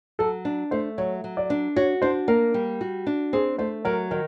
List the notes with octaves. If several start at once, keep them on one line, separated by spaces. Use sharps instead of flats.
F#3 A4
D4
A3 C5
F#3 C#5
F#3
D5
D4
F#4 C#5
D4 C5
A#3 A#4
G3
F#4
D4
C4 G#4
A3 C5
F#3 A#4
D#3 A#4